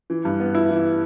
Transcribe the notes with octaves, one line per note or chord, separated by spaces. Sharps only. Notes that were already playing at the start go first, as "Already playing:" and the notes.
E3
G2
B3
E4
E3